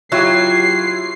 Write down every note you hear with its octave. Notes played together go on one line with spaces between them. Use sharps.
F#3 E4 F4 G4 C7